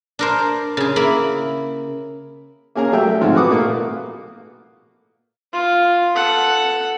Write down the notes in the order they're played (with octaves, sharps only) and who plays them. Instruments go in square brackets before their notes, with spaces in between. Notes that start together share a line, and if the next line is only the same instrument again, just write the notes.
[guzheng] D4 A#4 C5
C#3 G#4
A#3 E4 B5
[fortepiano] A#3 C#4 G#4 A#4 A#5
F#3 G3 A3 E5 G5
G#2 F3 F#3 G#3 C4
F#4 G#4 B4 F#5 D6 D#6
A#2 A3 A#3
[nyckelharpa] F4
A4 F#5